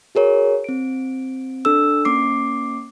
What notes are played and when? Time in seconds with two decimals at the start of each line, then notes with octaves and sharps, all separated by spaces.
0.15 F#4 G#4 A#4 C#5
0.64 C4 D7
1.65 D4 A4 E6
2.05 A#3 C#4 D6 C7